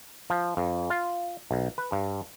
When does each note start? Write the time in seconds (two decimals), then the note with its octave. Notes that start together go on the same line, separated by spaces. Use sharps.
0.30 F3
0.57 F2
0.90 F4
1.51 B1
1.78 B4
1.92 G2